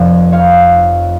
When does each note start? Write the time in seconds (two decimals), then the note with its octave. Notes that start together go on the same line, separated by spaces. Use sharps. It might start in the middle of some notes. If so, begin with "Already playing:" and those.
Already playing: F1 F2 F3 D5
0.32 C#5 F5